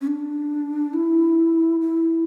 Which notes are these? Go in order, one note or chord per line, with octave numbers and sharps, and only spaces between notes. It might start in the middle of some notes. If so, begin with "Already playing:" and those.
C#4
D4
E4
E4